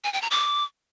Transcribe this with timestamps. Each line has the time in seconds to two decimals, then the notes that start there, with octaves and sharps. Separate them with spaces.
0.04 G#5
0.13 G5
0.22 A#5
0.31 D6